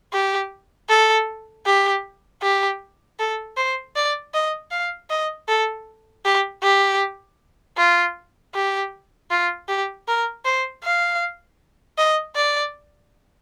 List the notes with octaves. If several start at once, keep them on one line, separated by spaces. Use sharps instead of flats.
G4
A4
G4
G4
A4
C5
D5
D#5
F5
D#5
A4
G4
G4
F4
G4
F4
G4
A#4
C5
F5
D#5
D5